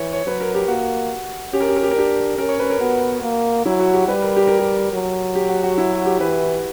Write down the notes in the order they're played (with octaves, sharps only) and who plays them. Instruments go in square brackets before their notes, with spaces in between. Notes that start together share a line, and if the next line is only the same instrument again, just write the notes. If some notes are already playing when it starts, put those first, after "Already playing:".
Already playing: [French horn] E3 [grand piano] C#5
[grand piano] C#5
[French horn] F#3 [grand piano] B4
[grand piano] A#4
G4
[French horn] A#3 [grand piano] F#4
[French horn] C#4 [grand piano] G4
[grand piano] A#4
G4
A#4
G4
A#4
[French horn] D4 [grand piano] G4
[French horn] C#4 [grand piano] A#4
[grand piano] C#5
B4
A#4
[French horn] B3 [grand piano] F#4
[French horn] A#3
[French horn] F#3 [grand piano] E4
[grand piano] F#4
G4
[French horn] G3 [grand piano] B4
[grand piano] A#4
G4
A#4
G4
[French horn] F#3
[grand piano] G4
F#4
F#4
E4
F#4
G4
[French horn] E3 [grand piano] B4